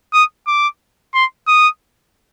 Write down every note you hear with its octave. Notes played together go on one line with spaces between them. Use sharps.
D#6
D6
C6
D#6